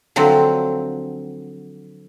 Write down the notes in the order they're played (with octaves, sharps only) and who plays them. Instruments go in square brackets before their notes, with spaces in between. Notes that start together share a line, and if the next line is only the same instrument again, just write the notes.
[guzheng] D3 F3 F#3 C4